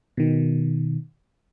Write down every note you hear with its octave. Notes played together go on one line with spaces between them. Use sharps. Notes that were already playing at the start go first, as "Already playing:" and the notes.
B2 D#3